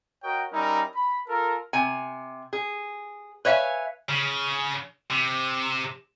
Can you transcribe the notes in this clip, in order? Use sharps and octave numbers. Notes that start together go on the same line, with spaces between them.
F#4 A#4 C#5 D#5 G5
G3 C#4 D#4 E4 A#4
B5
F4 A4 A#4
C3 G#5
G#4
B4 C#5 E5 F5 G#5
C#3
C3